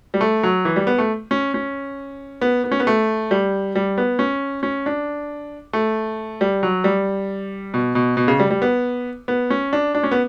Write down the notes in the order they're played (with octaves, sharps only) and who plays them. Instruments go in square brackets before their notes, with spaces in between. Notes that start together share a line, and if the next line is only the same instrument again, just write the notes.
[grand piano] G3
A3
F#3
E3
G3
B3
A3
C#4
C#4
B3
B3
C#4
B3
A3
G3
G3
B3
C#4
C#4
D4
A3
G3
F#3
G3
B2
B2
B2
C#3
G3
G3
B3
B3
C#4
D4
D4
C#4
B3